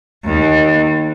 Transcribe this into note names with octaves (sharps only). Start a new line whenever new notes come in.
D#2